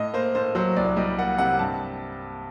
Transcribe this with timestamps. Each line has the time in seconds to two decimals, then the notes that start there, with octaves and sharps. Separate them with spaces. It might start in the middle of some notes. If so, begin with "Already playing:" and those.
Already playing: A2 D#5
0.14 A#3 C5
0.35 A2 C5
0.55 F#3 C5
0.76 C2 D5
0.97 G3 D#5
1.19 A#3 F#5
1.38 C3 F#5
1.59 G2 A5